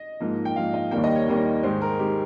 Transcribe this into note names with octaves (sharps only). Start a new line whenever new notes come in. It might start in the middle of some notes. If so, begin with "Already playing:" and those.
Already playing: D#5
G#2 F3 A#3
G5
G#2 F3 A#3 F5
D#5
D#2 D#3 G3 A#3 G5
D#5
C#5
D#2 D#3 G3 A#3
G#2 D#3 G#3 C5
A#4
D#3 G#3 G4